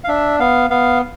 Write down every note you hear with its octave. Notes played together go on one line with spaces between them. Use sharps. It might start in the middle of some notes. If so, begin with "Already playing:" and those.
F5
D4 E5
B3 F5
B3 F5